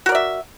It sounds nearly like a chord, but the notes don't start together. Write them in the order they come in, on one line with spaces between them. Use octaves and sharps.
F#4 A#4 D5 E5